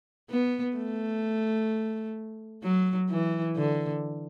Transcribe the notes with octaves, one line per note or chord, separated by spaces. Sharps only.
B3
A3
F#3
E3
D3